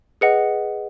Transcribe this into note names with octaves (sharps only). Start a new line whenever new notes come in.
G#4 B4 D#5 F#5 C#7